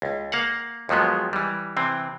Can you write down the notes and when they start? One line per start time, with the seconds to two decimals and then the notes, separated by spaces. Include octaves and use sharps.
0.02 C#2
0.32 A#3 F5 F#5
0.89 D#2 F3 F#3 G#3 B3
1.33 E3 G3
1.77 C3 E3 C4